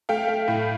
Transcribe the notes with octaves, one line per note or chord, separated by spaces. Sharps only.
A3 F5 G5
A3
A2